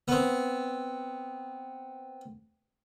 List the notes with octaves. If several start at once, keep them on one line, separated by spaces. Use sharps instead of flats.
B3 C4